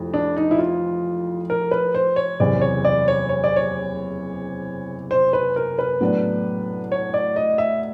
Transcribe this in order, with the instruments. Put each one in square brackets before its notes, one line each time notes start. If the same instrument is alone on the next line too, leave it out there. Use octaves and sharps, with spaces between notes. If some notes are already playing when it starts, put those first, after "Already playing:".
Already playing: [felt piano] F1 F2 E3
[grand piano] D4
D#4
E4
F4
A#4
B4
C5
C#5
[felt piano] F#1 E2 C3 [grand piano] D5
[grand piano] C#5
D5
C#5
C#5
D5
C#5
C5
B4
A#4
B4
[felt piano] A2 F#3 B3 D4
[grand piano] C#5
D5
D#5
E5